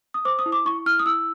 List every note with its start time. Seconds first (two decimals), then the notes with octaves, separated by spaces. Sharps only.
0.14 D#6
0.25 C5 D6
0.39 D#6
0.46 E4
0.52 D6
0.65 E4 C#6
0.86 E4 F6
0.99 D#6
1.06 E4 E6